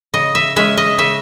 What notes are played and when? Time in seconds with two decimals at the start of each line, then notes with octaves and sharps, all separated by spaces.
0.14 C#3 D#5
0.35 E5
0.56 G#3 C#4 E5
0.77 D#5
0.98 C#3 E5